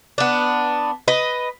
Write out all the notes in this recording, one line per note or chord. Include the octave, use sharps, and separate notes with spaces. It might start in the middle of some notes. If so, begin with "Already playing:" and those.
B3 D4
B4 D#5